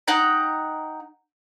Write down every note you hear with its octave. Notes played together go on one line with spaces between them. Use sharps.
D#4 F#5 G5 A#5